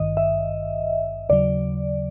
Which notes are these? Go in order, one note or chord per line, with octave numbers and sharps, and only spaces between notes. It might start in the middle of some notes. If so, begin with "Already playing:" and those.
Already playing: G#1 G2 D#3 D#5
E5
D#2 C#3 F#3 D5